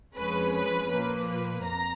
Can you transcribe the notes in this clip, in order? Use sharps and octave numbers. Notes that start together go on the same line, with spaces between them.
F2 F3 G#3 C#4 B4
B4
A#2 F3 A#3 B4
B4
F2 A#5